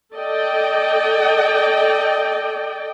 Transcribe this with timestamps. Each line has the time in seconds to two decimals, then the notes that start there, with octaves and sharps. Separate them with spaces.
0.14 A4 D5 D#5 G5